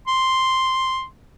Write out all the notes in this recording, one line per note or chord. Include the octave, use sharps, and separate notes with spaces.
C6